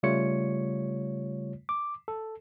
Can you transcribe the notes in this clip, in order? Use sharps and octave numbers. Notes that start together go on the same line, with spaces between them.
C#3 G3 A3 F4 C#5 C#7
D6
A4